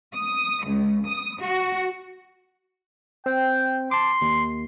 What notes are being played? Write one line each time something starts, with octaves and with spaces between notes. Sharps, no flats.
D#6
C#2
D#6
F#4
C4 G5
A5 C6 D6
D#2